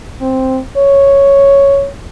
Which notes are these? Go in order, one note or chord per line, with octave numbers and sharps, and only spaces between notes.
C4
C#5